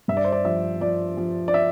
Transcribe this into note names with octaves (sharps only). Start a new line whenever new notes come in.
G2 E5
D5
C5
D5
F3 E5
F3 D5
F3
D5
E5